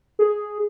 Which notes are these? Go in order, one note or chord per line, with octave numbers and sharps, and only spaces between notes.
G#4